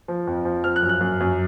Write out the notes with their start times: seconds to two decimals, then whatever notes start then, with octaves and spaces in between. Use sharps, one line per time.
0.08 F3
0.27 F2
0.45 F3
0.64 F3 F6
0.76 F#6
0.83 F#2
0.89 F#6
1.01 F#2
1.20 F#2